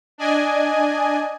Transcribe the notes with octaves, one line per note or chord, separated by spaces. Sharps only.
D4 D5 D#5 G#5